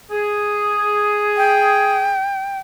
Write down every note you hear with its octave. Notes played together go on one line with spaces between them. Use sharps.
G#4
G5